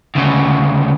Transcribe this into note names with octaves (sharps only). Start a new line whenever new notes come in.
D2 C#3